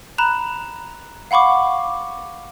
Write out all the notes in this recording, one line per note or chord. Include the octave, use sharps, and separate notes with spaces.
A#5 B5 F#6 E7 F7
F5 F#5 B5 C#6 D6